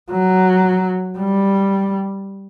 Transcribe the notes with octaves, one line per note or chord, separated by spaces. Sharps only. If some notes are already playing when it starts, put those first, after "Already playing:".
F#3
G3